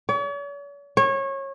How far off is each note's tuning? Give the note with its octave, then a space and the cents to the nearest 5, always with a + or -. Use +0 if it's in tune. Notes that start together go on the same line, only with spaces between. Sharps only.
C#5 +45
C#5 -25